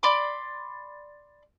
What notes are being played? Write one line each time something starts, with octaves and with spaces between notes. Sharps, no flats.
D5 B5 C6 D6